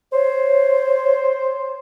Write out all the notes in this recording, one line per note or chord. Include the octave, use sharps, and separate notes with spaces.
C5 C#5